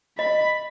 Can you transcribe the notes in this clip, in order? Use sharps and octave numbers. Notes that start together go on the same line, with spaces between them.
D#5 B5